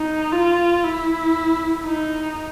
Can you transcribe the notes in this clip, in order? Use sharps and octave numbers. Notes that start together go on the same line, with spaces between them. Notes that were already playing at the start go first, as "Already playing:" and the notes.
Already playing: D#4
F4
E4
D#4